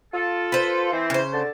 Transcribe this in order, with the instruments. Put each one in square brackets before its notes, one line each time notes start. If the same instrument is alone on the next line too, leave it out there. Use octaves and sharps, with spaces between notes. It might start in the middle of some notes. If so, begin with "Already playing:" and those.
[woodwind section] F4 A4
[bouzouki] B4 C5
[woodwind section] E3 C4
[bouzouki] C#3 C5
[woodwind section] D3 A5